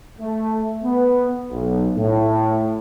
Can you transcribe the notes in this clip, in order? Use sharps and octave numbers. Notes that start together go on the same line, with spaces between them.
A3
B3
B1
A2